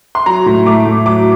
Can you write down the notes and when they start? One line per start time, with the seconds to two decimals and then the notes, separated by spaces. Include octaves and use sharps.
0.15 C6
0.26 F#3 A#5
0.46 A2
0.66 A3 D6
0.85 A2
1.06 F#3 D6